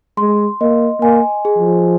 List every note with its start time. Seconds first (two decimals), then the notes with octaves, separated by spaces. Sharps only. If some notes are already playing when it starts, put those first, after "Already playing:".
0.17 G#3 C6
0.61 A#3 D#5
1.02 A#3 G#5
1.45 G#4
1.58 F3